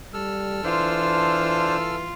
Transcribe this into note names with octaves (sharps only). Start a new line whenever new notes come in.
G3 A4 E6 F6
E3 D4 F4 C5